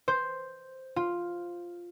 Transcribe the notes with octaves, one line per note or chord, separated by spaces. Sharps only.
C5
F4